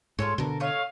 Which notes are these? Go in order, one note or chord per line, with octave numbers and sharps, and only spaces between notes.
G#2 F4 A4 C#5
B2 D3 A4 A#4
A3 C#5 D#5 F5